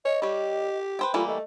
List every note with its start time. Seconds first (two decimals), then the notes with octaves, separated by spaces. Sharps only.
0.05 C#5 D#5
0.22 G3 G4 C#5
0.99 B4 C5 G5
1.14 E3 G3 A3 A#3 F4
1.28 A3 D#5